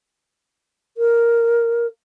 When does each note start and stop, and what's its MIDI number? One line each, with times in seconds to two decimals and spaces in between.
0.97 1.87 70